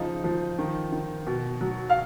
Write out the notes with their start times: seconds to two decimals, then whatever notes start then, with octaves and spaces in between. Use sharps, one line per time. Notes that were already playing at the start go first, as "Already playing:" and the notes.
Already playing: C#3 F3 D#4
0.24 F3
0.59 D#3
0.92 D#3
1.27 B2
1.61 F#3
1.90 F5